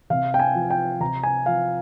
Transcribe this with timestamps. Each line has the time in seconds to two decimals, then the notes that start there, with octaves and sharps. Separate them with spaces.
0.10 C3 F5
0.34 G5
0.39 G#5
0.55 F3
0.70 G5
1.00 C3 A#5
1.23 G#5
1.46 F3 F5